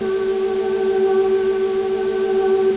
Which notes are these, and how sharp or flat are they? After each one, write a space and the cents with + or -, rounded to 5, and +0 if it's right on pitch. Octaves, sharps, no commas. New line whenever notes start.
A3 +0 G4 -35